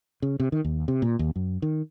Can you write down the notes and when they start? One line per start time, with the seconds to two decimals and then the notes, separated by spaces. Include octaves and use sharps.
0.22 C#3
0.40 C3
0.52 D#3
0.65 D#2
0.88 C3
1.02 A#2
1.19 D#2
1.36 F#2
1.62 D#3